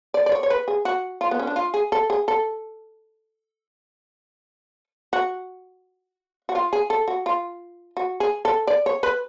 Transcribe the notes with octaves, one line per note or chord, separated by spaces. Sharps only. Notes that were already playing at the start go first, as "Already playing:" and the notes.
D5
D5
C#5
C#5
B4
G#4
F#4
F4
B3
C#4
D4
F4
G#4
A4
G#4
A4
F#4
F#4
F4
G#4
A4
F#4
F4
F#4
G#4
A4
D5
C#5
B4